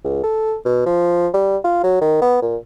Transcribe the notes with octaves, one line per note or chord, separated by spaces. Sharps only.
C#2
A4
B2
F3
G3
F4
F#3
D#3
B3
A#2